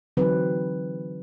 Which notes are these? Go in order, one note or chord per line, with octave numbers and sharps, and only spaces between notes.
D3 E3 F#3 C4 D#4 B4